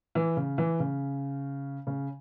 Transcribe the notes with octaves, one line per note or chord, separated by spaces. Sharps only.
E3
C#3
E3
C#3
C#3